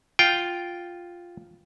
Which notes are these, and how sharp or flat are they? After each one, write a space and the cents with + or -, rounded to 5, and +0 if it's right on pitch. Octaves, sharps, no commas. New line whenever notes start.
F4 +0 G5 -5